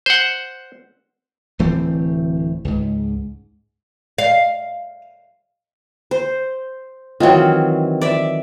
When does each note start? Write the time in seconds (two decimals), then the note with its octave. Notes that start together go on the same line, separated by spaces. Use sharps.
0.06 C5 F#5
1.59 D1 E3 A3 C4
2.65 C#2 G#2
4.18 F5
6.11 C5
7.20 D#3 E3 F#3 C4 F4
8.01 D5 E5